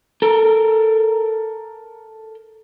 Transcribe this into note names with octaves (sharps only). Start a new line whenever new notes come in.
A4 A#4